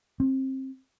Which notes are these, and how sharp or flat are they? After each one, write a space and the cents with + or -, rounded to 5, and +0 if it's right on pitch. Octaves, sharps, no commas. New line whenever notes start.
C4 +25